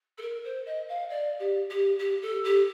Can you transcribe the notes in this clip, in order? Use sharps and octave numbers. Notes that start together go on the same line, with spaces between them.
A4
A#4
C5
D#5
F5
D5
G4
G4
G4
A4
G4